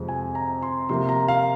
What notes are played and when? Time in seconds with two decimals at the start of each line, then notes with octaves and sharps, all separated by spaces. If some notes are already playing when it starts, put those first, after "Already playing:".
Already playing: F2 C3 F3 G#3
0.08 G#5
0.35 A#5
0.62 C6
0.89 C3 F3 A#3 C6
1.09 A#5
1.28 F5